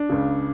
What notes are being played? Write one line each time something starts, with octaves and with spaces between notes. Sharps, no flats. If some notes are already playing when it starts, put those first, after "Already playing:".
Already playing: D4
C#2 C#3